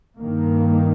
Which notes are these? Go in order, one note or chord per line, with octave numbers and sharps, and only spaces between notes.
G2 D#3 A#3